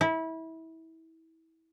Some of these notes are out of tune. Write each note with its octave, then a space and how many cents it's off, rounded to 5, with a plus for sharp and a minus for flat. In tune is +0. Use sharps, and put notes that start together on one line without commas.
E4 -25